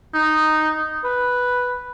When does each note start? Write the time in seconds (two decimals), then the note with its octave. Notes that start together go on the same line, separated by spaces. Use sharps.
0.14 D#4
1.05 B4